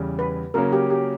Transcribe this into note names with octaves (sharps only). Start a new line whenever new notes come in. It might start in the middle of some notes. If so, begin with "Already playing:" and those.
Already playing: E2 C#3 G3
B4
C#3 F#3 A#3 C#4 A#4
G4
G4